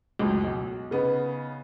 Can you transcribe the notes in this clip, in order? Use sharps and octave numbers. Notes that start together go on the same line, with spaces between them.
C#2 F#2 A2
B1
C#3 B3 D#4